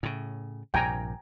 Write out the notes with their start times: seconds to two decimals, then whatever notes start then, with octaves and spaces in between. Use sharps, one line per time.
0.03 A2 C#3
0.74 A#1 G2 C3 G5 G#5 A#5